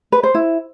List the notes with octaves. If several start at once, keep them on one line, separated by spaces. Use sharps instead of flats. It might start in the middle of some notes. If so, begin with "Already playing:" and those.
B4
C5
E4